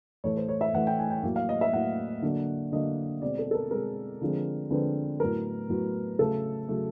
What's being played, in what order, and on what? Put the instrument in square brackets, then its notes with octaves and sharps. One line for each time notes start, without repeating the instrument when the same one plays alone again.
[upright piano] A2 E3 A3 C#5
C5
C#5
E5
A2 E3 A3 F#5
G5
G#5
G5
A2 F#3 A#3
F5
D#5
E5
A2 F#3 A#3 F#5
D3 F#3 A#3
D3 F#3 A#3 D#5
B2 G#3 C4 D5
A4
A4
A#4
B2 G#3 C4 A#4
D3 F3 G#3 C4
D3 F3 G#3 C4 B4
A2 F#3 B3 A#4
A2 F#3 B3
C#3 F#3 A3 A4
C#3 F#3 A3